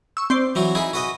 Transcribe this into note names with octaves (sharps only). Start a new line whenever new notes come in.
C#6 E6
C4 C5 D5
E3 F#3 F#4
D#4 E4 G#4 G#5 B5
F#4 B4 D#5